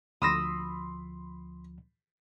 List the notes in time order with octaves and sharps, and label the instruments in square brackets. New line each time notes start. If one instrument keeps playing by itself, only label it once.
[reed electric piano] D2 F3 [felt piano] B5 C6 [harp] D#6 E6 A#6